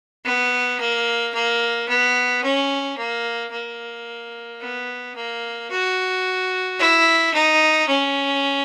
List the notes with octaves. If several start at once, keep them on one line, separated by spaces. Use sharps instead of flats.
B3
A#3
A#3
B3
C#4
A#3
A#3
B3
A#3
F#4
E4
D#4
C#4